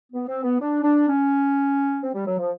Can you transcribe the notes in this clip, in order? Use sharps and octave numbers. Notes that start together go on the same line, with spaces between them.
B3
C4
B3
D4
D4
C#4
C4
G3
F#3
F3